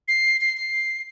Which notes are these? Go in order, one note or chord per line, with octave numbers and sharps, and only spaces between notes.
C7
C7
C7